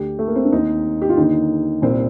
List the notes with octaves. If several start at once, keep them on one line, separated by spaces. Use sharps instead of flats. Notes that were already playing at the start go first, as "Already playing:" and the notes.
Already playing: D2 D3 G4
A3
A#3
C4
D4
D#2 D#3 D#4
G4
F4
D#2 D3 D#4
C2 A#2 C4